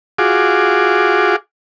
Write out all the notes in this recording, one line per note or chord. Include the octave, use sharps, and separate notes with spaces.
F4 F#4 G#4 D6